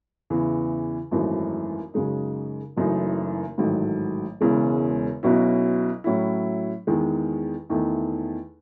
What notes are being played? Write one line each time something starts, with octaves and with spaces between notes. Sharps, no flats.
E2 C#3 E3
G#1 F#2 E3 A3 D#4
F#2 C#3 G#3 D#4
F#1 F#2 E3 A3 D#4
A1 G#2 D#3 F#3 A3
E1 E2 C#3 G#3
B1 B2 F#3 C#4 E4
A2 F#3 C#4 E4
E2 D#3 G#3
E2 D#3 A3 D#4